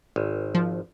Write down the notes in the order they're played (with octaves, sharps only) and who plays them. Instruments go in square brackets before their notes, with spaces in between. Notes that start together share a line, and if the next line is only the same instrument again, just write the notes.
[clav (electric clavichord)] G#1
[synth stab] F3